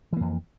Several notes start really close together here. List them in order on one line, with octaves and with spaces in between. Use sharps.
E3 A#3 F2